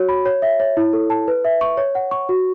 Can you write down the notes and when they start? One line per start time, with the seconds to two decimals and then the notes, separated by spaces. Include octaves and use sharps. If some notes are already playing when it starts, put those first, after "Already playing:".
Already playing: F#4 C#5
0.09 B5
0.26 C#5
0.42 E5
0.60 C#5
0.77 E4
0.93 A4
1.10 A5
1.28 B4
1.45 E5
1.61 C#6
1.77 C#5
1.95 F#5
2.11 C#6
2.29 F#4